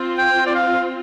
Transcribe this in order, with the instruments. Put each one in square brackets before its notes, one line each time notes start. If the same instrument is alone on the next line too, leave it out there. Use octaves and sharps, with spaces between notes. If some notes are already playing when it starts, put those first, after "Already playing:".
Already playing: [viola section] C4 F4
[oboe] G5
D5
F5